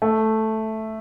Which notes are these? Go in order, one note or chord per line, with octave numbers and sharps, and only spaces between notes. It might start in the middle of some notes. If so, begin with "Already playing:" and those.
A3